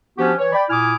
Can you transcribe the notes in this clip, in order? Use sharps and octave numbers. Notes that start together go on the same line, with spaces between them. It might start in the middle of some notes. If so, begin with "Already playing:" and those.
F3 B3 C#4 D4 F#4 G4
E3 C#5
D5 G5 B5
A#2 E4 G#5 D6 D#6 F6